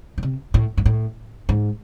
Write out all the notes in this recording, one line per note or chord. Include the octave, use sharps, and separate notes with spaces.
A2
C3
A2
G#2
A2
G#2